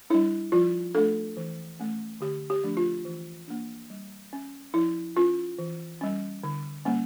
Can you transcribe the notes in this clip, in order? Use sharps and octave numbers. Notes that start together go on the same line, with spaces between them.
G3 D4 E4
F3 F4
A3 D4 A4
E3
A3 C#4
D3 G4
G4
F3 A3 D4
F4
E3
A#3 D4
G3
C#4
F3 E4
C#4 F4
E3
G3 C#4
D3
G3 A#3 C#4